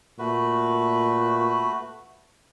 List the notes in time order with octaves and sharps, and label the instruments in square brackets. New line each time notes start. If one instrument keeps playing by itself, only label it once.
[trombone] A#2 [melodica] A3 F#4 B4